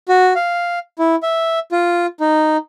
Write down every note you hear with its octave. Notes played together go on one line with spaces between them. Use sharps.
F#4
F5
E4
E5
F4
D#4